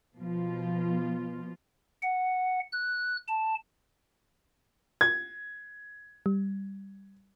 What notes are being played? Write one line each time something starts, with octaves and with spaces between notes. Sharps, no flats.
B2 F3 F4
F#5
F#6
A5
G#6
G3